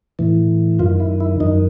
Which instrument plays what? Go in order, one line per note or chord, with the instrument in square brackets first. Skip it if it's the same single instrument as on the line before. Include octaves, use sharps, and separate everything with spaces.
[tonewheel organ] A2 E3
F#2 D#3 F4
E4
E4
F#2 D#3 D#4